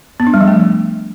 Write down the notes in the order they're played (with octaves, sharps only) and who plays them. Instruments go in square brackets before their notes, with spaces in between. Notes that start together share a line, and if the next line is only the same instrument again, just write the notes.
[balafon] B3
D4
G3
F3
A3